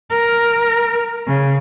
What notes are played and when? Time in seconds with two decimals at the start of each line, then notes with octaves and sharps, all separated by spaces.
0.11 A#4
1.27 C#3